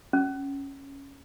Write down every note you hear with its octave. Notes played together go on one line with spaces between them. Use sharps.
C#4